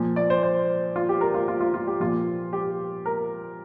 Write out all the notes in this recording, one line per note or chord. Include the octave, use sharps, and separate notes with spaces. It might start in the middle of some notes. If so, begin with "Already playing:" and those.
Already playing: A#2 F3
D5
C5
C5
F4
G4
A#4
F4
F4
F4
F4
G4
A#2 F3 F4
G4
A#4